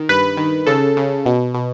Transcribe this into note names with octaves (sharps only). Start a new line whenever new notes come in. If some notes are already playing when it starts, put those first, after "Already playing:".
Already playing: D#3
G2 B4
D#3
C#3 A4
C#3
B2
B2